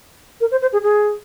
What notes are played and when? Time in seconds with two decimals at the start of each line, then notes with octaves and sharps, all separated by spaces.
0.41 A#4
0.51 C5
0.62 C5
0.73 G#4
0.83 G#4